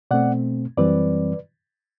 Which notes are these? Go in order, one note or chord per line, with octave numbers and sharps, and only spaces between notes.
B2 A3 C4 D5 F#5
F#2 E3 G3 C4 B4 D5